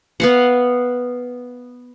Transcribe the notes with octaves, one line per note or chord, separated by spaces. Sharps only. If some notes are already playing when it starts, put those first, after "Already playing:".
B3 F5 F#5